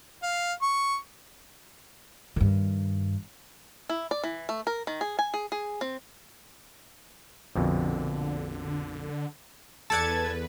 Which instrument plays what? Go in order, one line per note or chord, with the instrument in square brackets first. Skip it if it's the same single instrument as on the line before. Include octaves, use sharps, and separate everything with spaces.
[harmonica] F5
C#6
[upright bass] G2 D#3
[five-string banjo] E4
D5
E3
A3
A#4
D#3
G#4
G#5
G#4
G#4
C4
[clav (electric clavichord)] A#1 F2 B2 [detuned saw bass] D3
[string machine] E2 B4 [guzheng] A4 D5 F#5 [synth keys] A5 G#6 A6